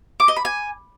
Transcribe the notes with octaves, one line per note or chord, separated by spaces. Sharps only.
D6
D#5
B5
G#5